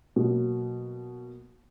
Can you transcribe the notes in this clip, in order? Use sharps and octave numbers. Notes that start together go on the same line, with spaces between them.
B2 F#3 A#3